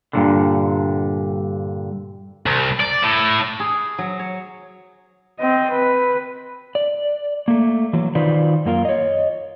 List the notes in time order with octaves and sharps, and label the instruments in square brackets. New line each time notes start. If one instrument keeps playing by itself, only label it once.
[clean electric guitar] G2 A#2 D3
[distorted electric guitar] C2
D5
A2
[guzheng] G#4
F#3
C#5
[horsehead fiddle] C4 D#5
B4
[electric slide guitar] D5
A3 A#3
E3 F#3
D#3 D#4 F4 B4 C5 D5
F#2 A#3 F4 A#4
C#5 D#5